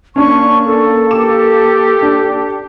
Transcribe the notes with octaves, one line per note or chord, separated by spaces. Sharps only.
A#3 C#4 D4 C#6
A4
G4 D6 E7
D4